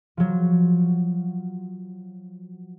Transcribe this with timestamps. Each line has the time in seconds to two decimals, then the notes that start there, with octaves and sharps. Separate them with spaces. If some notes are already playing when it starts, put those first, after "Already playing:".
0.17 F3 F#3